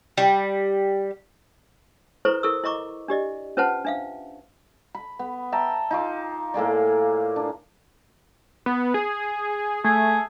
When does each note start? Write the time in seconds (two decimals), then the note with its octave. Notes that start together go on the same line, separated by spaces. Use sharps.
0.17 G3
2.25 E4 A4 B4 C5 A#5 C#6
2.43 E4 A4 A#4 C#6 E6
2.64 E4 D#5 A#5 C#6 D6
3.08 D4 G4 D5 D#5
3.57 C#4 F4 B4 C5 F#5 A5
3.85 D4 E5 F5
4.95 B5
5.19 B3
5.52 E5 G5 A5 A#5
5.91 D#4 F4 D6
6.54 A2 A#3 G#4 D5
7.36 D4
8.66 B3
8.94 G#4
9.84 A3 G#4